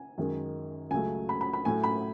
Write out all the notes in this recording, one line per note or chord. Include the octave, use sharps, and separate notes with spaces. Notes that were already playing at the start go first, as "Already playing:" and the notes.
Already playing: G#5
F#2 D#3 G#3
C#2 C#3 F#3 A3 G#5
B5
B5
B5
A2 F#3 A3 G#5
B5